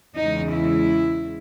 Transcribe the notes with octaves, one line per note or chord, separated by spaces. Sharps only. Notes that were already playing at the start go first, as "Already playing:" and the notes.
E2 C#3 G#3 D#4
E4